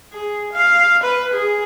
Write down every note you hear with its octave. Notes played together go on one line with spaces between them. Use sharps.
G#4
F5
B4
G#4